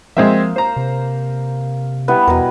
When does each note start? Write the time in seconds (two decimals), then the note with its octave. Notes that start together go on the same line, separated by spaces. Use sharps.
0.17 F3 G#3 A#3 C4 E5
0.56 C5 A#5
0.76 C3
2.08 G3 B3 E4 B4
2.28 E2 B2 A#4